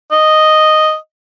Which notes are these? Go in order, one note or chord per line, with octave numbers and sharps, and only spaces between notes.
D#5